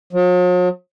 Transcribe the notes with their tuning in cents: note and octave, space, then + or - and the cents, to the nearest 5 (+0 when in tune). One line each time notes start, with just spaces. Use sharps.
F#3 -45